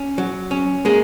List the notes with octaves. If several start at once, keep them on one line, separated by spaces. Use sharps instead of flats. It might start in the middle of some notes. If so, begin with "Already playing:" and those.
Already playing: C#4
F#3
C#4
G#3 A#3 G#4